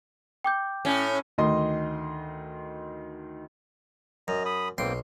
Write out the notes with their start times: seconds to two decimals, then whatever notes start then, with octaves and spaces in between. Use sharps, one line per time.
0.44 G5 D6 G6
0.85 A2 C#4
1.38 D2 D#3 D#5 C6
4.28 F#2 D#5 A#5
4.45 B5 D#6
4.78 B1 A#3 C4 G5 C6